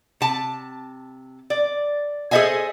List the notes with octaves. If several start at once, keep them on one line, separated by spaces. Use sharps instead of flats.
C3 A5
D5
G#4 A4 C5 D#5 E5 G#5